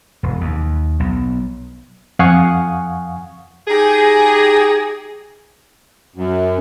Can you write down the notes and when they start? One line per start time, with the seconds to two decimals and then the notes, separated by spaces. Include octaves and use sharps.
0.23 E1
0.41 D#2
1.00 B1
2.19 F2 F5 F#5 G#5 C#6 D#6
3.68 D#4 G4 G#4
6.16 F#2